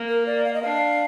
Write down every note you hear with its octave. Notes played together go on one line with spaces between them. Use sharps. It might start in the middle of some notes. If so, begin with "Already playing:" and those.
Already playing: A#3
A#4
D5
F5
D#5
D4 F5